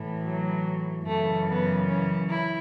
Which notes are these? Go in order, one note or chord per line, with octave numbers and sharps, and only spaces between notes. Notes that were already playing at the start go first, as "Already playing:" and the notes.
Already playing: A2 E3
F#3
F#2 C#3 E3 A3
B3
C#4
E4